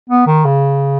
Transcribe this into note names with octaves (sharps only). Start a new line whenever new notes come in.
B3
D#3
C#3